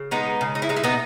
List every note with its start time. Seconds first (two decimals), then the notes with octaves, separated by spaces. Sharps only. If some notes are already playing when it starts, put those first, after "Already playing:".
Already playing: C#3
0.11 G#3 B3 D#4
0.41 C#3
0.55 D#4
0.62 E4
0.69 G#3 D#4
0.76 E4
0.84 B3 D#4